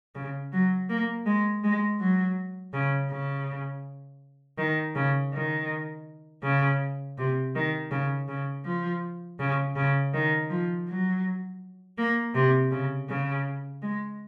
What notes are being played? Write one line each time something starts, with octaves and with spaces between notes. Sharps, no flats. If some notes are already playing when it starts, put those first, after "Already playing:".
C#3
F#3
A#3
G#3
G#3
F#3
C#3
C#3
D#3
C#3
D#3
C#3
C3
D#3
C#3
C#3
F3
C#3
C#3
D#3
F3
F#3
A#3
C3
C#3
C#3
G#3